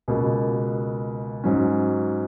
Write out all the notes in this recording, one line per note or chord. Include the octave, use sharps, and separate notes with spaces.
C#2 B2 A#3
G#2 F#3 C#4